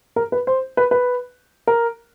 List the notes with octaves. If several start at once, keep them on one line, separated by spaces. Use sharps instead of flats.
A#4
B4
C5
B4
B4
A#4